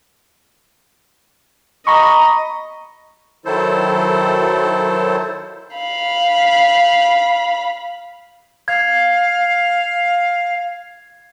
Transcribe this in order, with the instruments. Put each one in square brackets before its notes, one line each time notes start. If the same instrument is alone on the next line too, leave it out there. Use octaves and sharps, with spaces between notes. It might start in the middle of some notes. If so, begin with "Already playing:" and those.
[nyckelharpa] D#5 [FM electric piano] A#5 B5 C#6
[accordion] D#3 F#3 E4 A4 C5
[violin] F5 B5
[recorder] F5 [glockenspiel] G#6